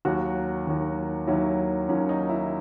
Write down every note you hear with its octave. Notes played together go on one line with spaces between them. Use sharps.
D#2 D#3 F#3 F#4
D#2 D#3 F#3
D#2 D#3 F#3 E4
D#2 D#3 F#3 C#4
D#4
E4